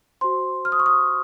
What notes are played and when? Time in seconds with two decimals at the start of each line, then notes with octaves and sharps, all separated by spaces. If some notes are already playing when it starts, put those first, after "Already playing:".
0.21 F#4 C5 C6
0.65 F6
0.72 D#6
0.79 C#6
0.86 D#6